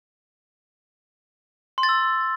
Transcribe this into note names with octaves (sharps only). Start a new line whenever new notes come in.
C6
A6
E6